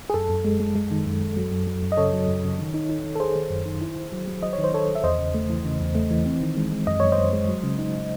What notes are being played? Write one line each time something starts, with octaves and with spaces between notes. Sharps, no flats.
G#4
F#2 A4
F#2
G#3
G#3
G#3
D#3
F#2
F#2
F#3
F#2
F#3
F#2
D#5
C#3 A4 C#5
F#3
F#2
C#3
D#3
D#4
D#4
D#3
A4
D#4 G#4 C5
D#3
F#2
D#3
E4
D#3
F#3
F#3
F#3 D#5
D#3 C#5
C5
D#3 A4 C#5
D#3
E5
E2 C5 D#5
C#3
A3
E3
C#3
E2
A3
E3
C4
D#3
G#3
G#3
F#2 D#5
F#2 C#5
C5 D#5
F#2
G#3
F#3
C#3
D#4
C#3